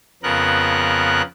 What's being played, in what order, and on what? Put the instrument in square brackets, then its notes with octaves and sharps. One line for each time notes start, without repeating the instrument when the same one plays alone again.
[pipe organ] F2 C#3 B3 A#4 F#6